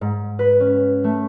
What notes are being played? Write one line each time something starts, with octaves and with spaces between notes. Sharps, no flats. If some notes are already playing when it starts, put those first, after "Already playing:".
G#2
B4
C#4
A3